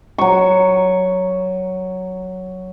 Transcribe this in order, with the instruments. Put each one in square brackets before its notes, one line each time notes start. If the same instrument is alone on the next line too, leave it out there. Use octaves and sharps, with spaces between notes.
[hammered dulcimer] F#3 C#6